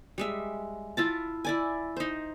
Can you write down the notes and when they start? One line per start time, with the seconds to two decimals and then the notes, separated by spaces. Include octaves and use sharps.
0.18 G3 G#3 E5
0.97 E4 F4 A5
1.45 E4 D5 G#5
1.97 D#4 C5